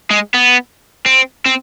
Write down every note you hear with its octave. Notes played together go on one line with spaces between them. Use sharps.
G#3
B3
C4
C4